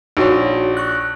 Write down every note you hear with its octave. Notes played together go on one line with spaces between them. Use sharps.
A#1 D#4 F#4 C#5
C#6 F#6